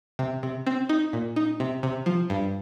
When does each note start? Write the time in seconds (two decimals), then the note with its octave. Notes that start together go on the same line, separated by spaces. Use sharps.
0.19 C3
0.43 C3
0.66 C4
0.89 D#4
1.13 A#2
1.36 D#4
1.60 C3
1.83 C3
2.06 F3
2.30 G2